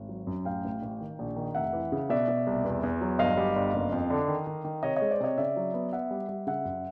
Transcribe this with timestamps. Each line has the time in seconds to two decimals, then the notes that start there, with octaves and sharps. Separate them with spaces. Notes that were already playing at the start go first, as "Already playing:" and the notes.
Already playing: G#1
0.09 F#3
0.27 F#2
0.45 A1 F5 G5
0.64 A1
0.82 A1
1.01 D#3
1.19 A#1
1.36 D#3
1.55 F1 E5 F#5
1.73 E3
1.92 C#3
2.09 B2 D5 E5
2.28 B2
2.47 C2
2.64 E2
2.83 E2
3.01 F#3
3.19 G1 D#5 F5
3.37 G3
3.56 G1
3.74 F#1
3.92 F2
4.10 D3
4.28 D#3
4.47 D#3
4.64 D#3
4.83 C3 C#5 D#5
4.96 C#5 D#5
5.02 G#3
5.11 C5 D5
5.20 C3 C#5 D#5
5.38 C#3 D5 E5
5.57 F#3
5.74 B3
5.92 B3 E5 F#5
6.11 G3
6.29 G3
6.47 C#3 E5 F#5
6.65 F#2